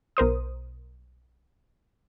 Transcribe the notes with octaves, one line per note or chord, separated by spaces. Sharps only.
B1 A#4 C5 D#6